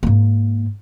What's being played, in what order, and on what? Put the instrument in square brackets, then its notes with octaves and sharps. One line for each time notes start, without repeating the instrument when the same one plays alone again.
[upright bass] G#2 A#3